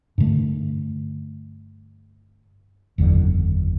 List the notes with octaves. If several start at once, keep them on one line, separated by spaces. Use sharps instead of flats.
G2 D3 A3
F#1 E2 D3